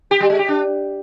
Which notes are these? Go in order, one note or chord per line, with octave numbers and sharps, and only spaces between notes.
G4
G3
G#3
G4
D4